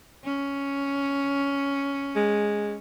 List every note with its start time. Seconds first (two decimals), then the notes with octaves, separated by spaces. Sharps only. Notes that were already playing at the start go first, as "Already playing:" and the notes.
0.25 C#4
2.16 G#3